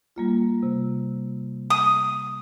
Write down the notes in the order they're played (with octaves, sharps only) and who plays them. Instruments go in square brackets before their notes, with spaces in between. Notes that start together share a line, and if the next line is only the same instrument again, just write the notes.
[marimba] G3 A#3 F4
C3
[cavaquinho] D#6